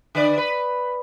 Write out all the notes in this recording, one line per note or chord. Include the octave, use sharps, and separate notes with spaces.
D3 B4 D5
B4